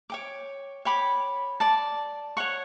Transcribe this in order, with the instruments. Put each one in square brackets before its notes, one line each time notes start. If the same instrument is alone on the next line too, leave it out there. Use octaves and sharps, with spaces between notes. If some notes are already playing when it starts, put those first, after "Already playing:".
[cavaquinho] C#5 G5 D6
C#5 G5 B5 D6
D5 A5 D6
C#5 F#5 C#6